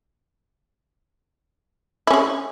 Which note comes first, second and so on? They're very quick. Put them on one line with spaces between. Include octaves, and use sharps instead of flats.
E4 C#4 G#4